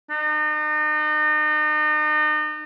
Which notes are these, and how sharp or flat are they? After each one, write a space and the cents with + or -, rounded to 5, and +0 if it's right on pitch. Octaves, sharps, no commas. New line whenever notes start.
D#4 -40